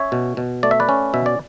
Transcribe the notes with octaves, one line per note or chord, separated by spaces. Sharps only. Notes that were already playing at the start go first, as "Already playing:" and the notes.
Already playing: C#4 C#5 E5
B2
B2
A3 D5
E5
B4 D5
C#4
B2 E5
D5